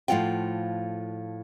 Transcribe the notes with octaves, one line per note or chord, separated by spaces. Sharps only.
A2 F3 D4 F4 F#5 G5